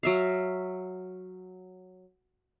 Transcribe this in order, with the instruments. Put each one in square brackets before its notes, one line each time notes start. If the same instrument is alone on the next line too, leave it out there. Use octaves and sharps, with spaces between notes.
[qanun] F#3 E5 F5